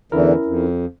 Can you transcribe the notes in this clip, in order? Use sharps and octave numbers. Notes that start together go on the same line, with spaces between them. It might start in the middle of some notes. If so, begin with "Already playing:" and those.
E2 D3 E3 C#4 E4 A#4
F2